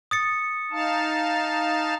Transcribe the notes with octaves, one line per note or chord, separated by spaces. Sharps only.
D#6 A6 C#7
D#4 F5 A5